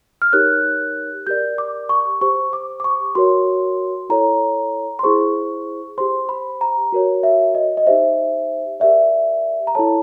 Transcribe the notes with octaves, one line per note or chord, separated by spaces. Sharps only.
F6
D#4 G4 A#4 C#5 F#6
G4 A#4 D5 G6
D6
C#6
G4 C5 C#6
D6
D6
C#6
F#4 A#4 C#5 C6
E4 A4 C#5 A#5
C6
E4 G#4 C5 C#6
G4 C5 C6
B5
A#5
F#4 A#4 C#5
E5
D#5
D#5
D#4 G4 C5 E5
G4 A#4 D5 E5
A#5
E4 A4 C#5 A5